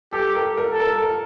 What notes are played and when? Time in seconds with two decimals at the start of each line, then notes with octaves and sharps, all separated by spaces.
0.13 G4 A4
0.35 A#4
0.57 A#4
0.72 A4
0.80 A#4
1.02 A#4